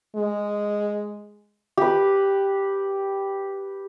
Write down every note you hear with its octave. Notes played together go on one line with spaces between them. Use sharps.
G#3
G4 B4